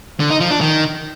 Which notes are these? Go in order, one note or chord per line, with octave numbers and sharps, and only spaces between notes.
D3
D#4
F3
D4
D#3